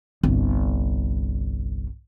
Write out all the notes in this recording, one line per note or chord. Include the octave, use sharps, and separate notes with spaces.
G1 C2